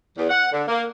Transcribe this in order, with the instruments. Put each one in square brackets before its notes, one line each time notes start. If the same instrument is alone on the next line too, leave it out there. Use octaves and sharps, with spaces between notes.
[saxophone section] E2
F#5
D3
A#3